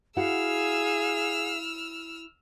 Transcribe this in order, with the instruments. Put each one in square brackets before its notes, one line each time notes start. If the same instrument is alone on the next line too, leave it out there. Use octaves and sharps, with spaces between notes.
[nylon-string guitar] E4 F#4 F#5 [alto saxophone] G#4 [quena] F5 [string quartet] E6 F6